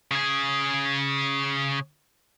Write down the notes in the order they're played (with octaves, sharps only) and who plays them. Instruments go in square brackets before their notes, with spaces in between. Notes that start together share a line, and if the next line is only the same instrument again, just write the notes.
[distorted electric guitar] C#3 G#4